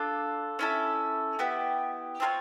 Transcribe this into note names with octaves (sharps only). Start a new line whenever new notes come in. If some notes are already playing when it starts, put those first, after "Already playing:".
Already playing: D4 F4 A4
C#4 E4 A4
B3 E4 G4
C4 F4 A#4 C#5